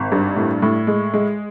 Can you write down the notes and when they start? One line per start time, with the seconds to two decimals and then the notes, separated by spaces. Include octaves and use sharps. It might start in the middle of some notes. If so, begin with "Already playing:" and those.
Already playing: G#1
0.12 G2
0.36 A2
0.62 A2
0.87 G#3
1.14 G#3